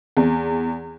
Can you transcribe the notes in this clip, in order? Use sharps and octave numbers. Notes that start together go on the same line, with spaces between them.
E2